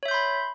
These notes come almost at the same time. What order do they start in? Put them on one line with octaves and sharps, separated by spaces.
C#5 E5 G6 C6 B5